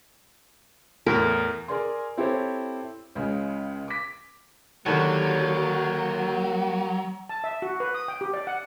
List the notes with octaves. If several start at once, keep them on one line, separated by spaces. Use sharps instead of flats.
E2 A2 A#4
G#4 A#4 D5 G#5 C6
C4 E4 G4 A4 C5 C#5
C#2 C#3 G#3
D6 B6
D#2 D3 D#3 F#3 A#3 G4 B4 C#5
A5
E5
F#4
B4
D#6
G5
G4
D5
F#5